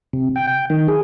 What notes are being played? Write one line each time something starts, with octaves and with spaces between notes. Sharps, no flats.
C3
G5
G5
D#3
G#4